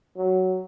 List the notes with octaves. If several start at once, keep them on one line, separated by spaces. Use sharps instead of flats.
F#3